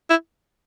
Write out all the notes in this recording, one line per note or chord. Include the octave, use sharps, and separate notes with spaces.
E4